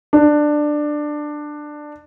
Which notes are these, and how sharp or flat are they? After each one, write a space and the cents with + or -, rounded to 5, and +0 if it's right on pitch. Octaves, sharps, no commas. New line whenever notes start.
D4 +15